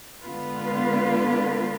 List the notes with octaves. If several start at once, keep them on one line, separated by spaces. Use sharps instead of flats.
D3 G#3 B3 F4 B4